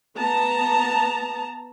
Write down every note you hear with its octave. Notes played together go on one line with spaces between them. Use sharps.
B3 A5 A#5